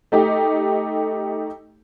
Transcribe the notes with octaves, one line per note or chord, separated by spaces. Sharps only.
A3 D#4 G4